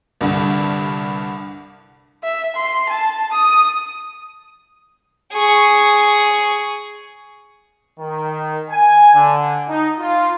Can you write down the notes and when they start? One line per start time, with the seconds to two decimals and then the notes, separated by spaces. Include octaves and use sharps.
0.21 C2 G2 D3
2.23 E5
2.56 C6
2.89 A5
3.31 D#6
5.34 G#4 C#6
8.00 D#3
8.71 G#5
9.15 D3
9.68 D#4
10.00 F4